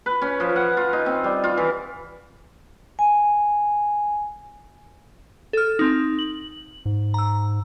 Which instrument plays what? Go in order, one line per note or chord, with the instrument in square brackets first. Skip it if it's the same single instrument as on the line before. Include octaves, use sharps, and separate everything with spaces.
[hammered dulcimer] B4
C#4
F3
F#5
F4
D#4
C4
G3
F4
E3
[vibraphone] G#5
[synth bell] A4 F6
C4 D#4
F#7
[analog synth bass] G#2
[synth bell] A#5 E6